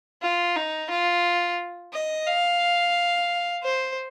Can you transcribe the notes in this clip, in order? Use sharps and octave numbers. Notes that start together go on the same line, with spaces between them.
F4
D#4
F4
D#5
F5
C5